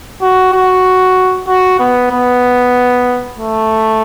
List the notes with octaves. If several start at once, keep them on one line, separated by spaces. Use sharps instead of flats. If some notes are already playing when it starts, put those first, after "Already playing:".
F#4
F#4
F#4
B3
B3
A3